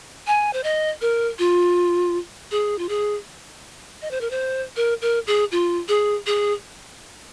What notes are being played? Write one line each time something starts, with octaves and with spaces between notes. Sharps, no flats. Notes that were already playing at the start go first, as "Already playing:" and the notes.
G#5
C5
D#5
A#4
F4
G#4
F4
G#4
D#5
C5
A#4
C5
A#4
A#4
G#4
F4
G#4
G#4